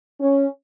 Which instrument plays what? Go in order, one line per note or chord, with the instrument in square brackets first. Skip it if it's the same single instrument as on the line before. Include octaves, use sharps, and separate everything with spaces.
[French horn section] C#4